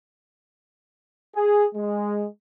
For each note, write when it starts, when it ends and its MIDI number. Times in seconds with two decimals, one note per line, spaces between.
1.35 1.64 68
1.74 2.25 56